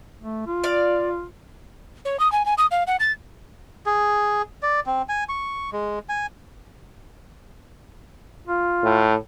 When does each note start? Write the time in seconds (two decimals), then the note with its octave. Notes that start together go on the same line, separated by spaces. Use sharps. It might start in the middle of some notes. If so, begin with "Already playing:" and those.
0.20 A3
0.47 F4
0.64 D5 F5
2.05 C#5
2.19 D#6
2.32 G#5
2.46 G#5
2.58 D#6
2.71 F5
2.87 F#5
3.00 A6
3.86 G#4
4.63 D5
4.86 C4
5.09 G#5
5.29 C#6
5.73 G#3
6.09 G#5
8.47 F4
8.84 A2